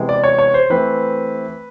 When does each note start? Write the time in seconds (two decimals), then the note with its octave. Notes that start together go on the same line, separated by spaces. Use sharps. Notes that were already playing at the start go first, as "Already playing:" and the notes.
Already playing: C3 E3 G#3 B3
0.09 D5
0.24 C#5
0.39 C#5
0.54 C5
0.70 E3 A3 C4 B4